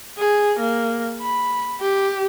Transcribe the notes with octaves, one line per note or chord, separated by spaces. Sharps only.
G#4
A#3
B5
G4